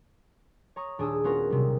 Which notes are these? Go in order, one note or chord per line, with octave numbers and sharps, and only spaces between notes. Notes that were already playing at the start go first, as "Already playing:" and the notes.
C#5 A#5 C#6 D#6
D#1 D4 G#4 D#6 E6
B3 C#4 F4 F#4 A#4
B1 C3 G3